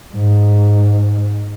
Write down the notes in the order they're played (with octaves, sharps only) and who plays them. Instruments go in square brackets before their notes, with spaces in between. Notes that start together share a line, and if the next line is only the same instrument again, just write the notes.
[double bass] G#2